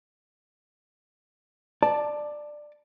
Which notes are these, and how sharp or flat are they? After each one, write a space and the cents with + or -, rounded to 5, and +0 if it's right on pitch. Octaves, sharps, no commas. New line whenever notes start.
D5 +15 A5 +0